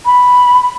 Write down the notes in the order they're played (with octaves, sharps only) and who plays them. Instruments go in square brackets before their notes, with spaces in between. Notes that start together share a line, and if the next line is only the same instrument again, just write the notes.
[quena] B5